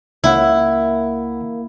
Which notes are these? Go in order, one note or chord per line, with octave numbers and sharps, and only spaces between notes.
C#2 A#3 E4 E5 F#5